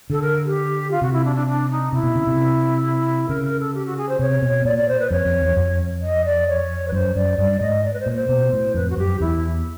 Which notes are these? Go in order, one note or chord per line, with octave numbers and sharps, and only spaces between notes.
D3 A4
A#4
G4
F4
C3 F#4
E4
D4
D4
D4
D#4
C3 E4
B2
C#3
C3
C#3 A#4
A#4
A4
G4
F#4
G#4
C5
C3 C#5
B2
A#2 D5
D5
C5
B4
F2 C#5
F2
E2
F2
D#5
D5
C#5
B4
F#2 C5
F#2 D5
G2 D5
G#2 D#5
D5
B4
C5
A#2 C#5
C5
B2
A2
F2 B4
F#4
F#2 G4
E2 E4